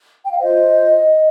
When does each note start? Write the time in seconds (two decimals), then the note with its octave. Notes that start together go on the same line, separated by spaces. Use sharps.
0.23 G5
0.32 F5
0.38 F4 C5 D#5